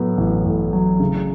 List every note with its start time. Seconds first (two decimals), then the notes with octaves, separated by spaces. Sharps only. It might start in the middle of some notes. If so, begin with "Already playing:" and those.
Already playing: A2 F#3 B3
0.17 A1
0.45 A2
0.73 F#3
1.00 C#3